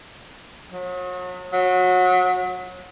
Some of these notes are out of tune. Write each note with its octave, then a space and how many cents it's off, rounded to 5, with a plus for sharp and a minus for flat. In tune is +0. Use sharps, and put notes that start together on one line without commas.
F#3 -35
F#3 -25